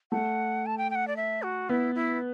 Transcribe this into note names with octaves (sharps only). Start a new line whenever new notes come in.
A3 F#5
A5
G5
G5
F#5
D5
E5
F#4
B3 E4
E4